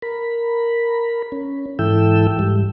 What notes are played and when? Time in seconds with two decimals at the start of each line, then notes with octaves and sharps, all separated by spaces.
0.02 A#4 B5
1.32 C#4
1.79 G#2 E3 E4 A4 G5 E6
2.39 G#2 G3